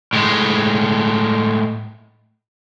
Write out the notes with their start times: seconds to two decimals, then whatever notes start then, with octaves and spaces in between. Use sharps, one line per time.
0.13 A2 G#3